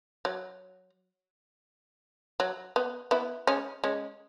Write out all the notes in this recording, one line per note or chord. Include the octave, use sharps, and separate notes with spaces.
F#3
F#3
B3
B3 E4
G#3 C#4
G#3 C#4